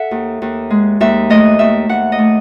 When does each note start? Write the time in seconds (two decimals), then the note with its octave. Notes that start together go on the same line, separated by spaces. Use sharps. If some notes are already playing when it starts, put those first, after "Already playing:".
Already playing: A4 E5 F#5
0.11 D#2
0.42 D#2
0.70 G#3
1.00 D#2 E5
1.30 A3 D#5
1.59 D#2 E5
1.89 D#2 F#5
2.12 D#5
2.18 A3